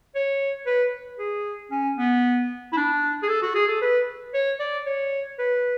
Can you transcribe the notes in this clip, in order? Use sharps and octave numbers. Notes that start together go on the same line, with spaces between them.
C#5
B4
G#4
C#4
B3
E4
D4
G#4
A4
F#4
G#4
A4
B4
C#5
D5
C#5
B4